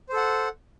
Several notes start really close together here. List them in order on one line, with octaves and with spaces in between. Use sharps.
C5 A4 F#5